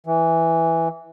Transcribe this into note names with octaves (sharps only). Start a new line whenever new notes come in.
E3